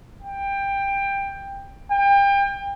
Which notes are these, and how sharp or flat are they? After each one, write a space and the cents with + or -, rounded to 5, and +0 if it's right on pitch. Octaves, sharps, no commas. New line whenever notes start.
G5 +20
G5 +30